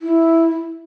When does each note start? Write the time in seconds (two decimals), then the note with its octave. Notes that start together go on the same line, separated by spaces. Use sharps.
0.02 E4